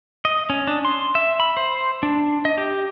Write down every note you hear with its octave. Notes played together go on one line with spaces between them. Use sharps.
D#5
C#4
D4
C6
E5
B5
C5
D4
D#5
G4